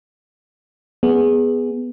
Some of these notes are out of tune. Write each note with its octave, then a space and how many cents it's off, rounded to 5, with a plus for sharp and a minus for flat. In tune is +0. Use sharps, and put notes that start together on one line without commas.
B3 +0 G#4 +0